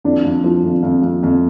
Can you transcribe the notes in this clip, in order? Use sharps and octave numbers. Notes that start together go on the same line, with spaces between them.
F2 D4
F2
F3
F2
F2
F2
F2